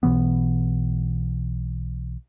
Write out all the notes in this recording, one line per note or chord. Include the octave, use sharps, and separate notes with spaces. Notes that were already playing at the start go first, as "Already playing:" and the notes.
B1 B2 E3 B3